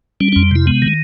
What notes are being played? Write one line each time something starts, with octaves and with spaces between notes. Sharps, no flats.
G3 C#4
F2 C#4
C3 E4
G#3 B3
D#3